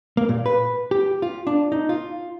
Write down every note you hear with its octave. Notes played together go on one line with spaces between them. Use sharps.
A#3
A#2
B4
G4
F4
D4
D#4
F4